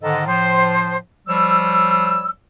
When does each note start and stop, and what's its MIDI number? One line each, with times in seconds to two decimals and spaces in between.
0.02 0.24 44
0.02 0.24 50
0.02 0.24 51
0.02 0.24 69
0.02 0.24 75
0.26 0.96 45
0.26 0.96 53
0.26 0.96 72
1.28 2.30 53
1.28 2.30 55
1.28 2.30 73
1.28 2.30 88